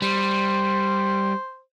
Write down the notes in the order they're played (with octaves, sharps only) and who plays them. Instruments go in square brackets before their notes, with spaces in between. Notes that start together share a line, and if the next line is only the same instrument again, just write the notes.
[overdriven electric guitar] G3 [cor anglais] C5